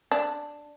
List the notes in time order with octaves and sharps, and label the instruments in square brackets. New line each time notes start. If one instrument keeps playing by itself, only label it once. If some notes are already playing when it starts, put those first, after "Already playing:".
[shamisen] D4